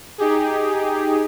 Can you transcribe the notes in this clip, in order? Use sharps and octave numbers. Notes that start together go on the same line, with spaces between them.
D#4 G4 G#4